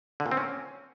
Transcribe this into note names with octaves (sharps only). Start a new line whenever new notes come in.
D3
A#2
C4
C#4